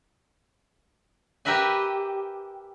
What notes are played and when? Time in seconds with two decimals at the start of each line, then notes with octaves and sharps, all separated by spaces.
1.45 G4 A#4 B4 E5 G#5